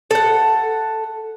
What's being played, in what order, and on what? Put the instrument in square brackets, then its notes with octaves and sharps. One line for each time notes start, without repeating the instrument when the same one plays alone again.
[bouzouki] A4 F#5